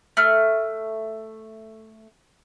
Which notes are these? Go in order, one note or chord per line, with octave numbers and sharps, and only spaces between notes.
A3 F6